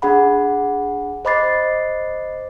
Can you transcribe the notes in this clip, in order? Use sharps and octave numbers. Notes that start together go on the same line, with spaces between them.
D4 G#4 F#5 B5
C5 D#5 B5 D6 A6 C7